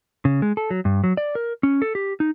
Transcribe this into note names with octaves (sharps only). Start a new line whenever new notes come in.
C#3
G#3
A4
F#3
G2
F#3
D5
A#4
C#4
A4
G4
D#4